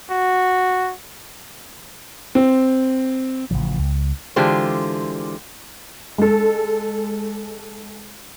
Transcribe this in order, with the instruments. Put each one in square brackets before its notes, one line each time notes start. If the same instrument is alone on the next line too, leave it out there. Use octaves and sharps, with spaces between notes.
[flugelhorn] F#4
[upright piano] C4
[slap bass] A1 C#3 F3
C#2
[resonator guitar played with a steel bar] D3 E3 G#3 F4 G4 C5
[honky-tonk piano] G#3 A4